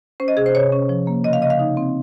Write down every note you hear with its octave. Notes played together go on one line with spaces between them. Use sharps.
C#4 C5
D#5
C3 G#4
C5
C3 C#5
C#4
F3
A#3
C#3 D#5
F5
C#3 D#5
F5
D#4
C4